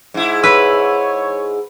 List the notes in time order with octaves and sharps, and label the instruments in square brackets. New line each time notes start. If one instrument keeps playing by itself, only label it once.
[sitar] G#2 E4
[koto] B4 [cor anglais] C#5 [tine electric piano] E6